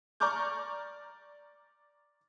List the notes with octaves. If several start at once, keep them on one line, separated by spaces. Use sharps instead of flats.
D5 A#5 C#6 D6 F6 G6